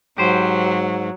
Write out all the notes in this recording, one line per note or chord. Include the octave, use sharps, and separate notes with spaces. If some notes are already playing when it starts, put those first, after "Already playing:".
G#2 F#3 G4 C5